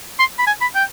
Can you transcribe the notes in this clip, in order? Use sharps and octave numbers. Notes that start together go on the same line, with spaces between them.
C6
B5
G#5
B5
G5